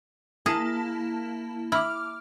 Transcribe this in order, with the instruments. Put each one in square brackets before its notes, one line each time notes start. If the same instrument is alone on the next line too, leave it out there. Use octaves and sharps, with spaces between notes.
[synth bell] A#3 E4 A5 [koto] G#4
[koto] E4 [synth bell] D6 F6